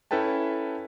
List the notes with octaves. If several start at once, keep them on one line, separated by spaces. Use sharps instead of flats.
C#4 E4 A4 B4 G5 A5